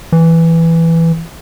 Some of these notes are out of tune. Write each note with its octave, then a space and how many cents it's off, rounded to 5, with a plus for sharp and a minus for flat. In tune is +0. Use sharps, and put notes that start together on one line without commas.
E3 +5